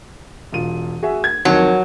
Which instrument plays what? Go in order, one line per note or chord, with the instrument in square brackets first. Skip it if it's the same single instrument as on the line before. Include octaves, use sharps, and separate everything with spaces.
[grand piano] E1 F4 D#7
F#4 G#4 E5
G#6
[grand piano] F2 D#3 [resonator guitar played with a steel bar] F#3